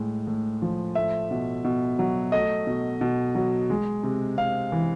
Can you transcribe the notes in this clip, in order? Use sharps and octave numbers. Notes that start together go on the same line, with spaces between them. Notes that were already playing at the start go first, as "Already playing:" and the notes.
Already playing: A2 G#3
A2
F3
A3 E5
B2
B2
F#3
A3 D#5
B2
B2
F#3
G#3
C3
C3 F5
E3